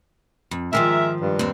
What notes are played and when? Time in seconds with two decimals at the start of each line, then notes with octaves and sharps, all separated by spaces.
0.51 F2
0.73 G#2 D#3 F3 G#3 A#4 E5
1.21 G2
1.39 D#2 C4